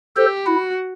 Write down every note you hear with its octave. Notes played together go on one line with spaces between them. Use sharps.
G4 A4 C5
E4 F#4